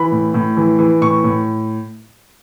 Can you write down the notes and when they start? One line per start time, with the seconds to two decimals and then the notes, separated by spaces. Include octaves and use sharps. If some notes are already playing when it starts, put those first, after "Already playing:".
Already playing: E3 B5
0.12 A2
0.34 A2
0.57 E3
0.79 E3
1.02 A2 C#6
1.24 A2